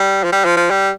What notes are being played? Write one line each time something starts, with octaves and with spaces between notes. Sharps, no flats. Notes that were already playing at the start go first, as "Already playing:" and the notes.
Already playing: G3
F3
G3
F3
F3
G3